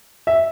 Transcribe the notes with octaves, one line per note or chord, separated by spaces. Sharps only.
E5